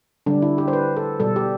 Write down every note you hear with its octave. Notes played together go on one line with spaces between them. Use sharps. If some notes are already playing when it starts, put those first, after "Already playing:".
D3 G3 D4
E4
G4
C5
B4
A4
B2 G3 A4
G4